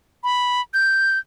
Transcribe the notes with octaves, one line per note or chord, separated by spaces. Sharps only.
B5
G6